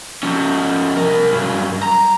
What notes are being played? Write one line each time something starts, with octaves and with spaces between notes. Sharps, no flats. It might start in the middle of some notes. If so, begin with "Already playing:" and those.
F3 C#4
C2 A#4
G2 F#3
A#5